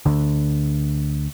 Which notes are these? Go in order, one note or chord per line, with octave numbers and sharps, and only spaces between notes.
D2 D3